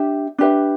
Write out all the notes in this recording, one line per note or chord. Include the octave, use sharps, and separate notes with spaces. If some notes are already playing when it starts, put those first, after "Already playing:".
Already playing: D4 G4 E5
D4 G4 B4 E5